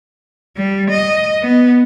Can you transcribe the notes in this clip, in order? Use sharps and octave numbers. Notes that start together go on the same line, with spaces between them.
G3
D#5
B3